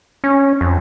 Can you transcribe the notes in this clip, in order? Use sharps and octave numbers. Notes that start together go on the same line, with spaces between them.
C#4
F2